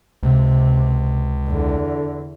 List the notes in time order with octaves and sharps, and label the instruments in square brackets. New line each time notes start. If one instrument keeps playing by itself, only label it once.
[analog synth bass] C#2 [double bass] C3
[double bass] E2 [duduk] D3